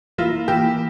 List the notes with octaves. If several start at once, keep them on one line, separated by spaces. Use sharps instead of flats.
E3 A#3 E4 F4
E3 A#3 E4 G4